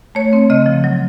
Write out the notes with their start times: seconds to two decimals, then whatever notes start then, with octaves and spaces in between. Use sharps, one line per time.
0.15 A3 C#5
0.33 C4
0.50 C#3 D#5
0.66 F3
0.84 F#3